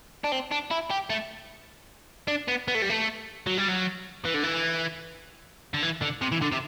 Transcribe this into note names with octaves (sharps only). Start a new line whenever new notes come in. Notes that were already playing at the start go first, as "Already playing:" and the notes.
D4
C4
D4
E4
G4
A3
D4
B3
B3
A3
G3
A3
F#3
G3
F#3
E3
D3
E3
D3
E3
D3
C3
E3
D3
C3